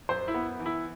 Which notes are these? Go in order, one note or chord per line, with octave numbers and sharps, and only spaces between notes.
F#2 C5
E4
B3
E3
E4